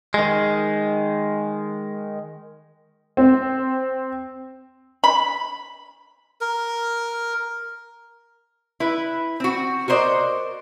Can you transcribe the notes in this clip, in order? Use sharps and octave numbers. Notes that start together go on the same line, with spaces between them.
D#3 G#3
C4
B5
A#4
E4 B4
C4 F#4
F#4 A#4 C5 D5 D#5